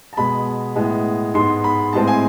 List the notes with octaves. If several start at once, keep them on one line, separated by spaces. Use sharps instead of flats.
A5
B2 G#3 B3 B5
A2 G#3 B3
G#2 G#3 B3 C6
B5
A2 G#3 C4 A5
G#5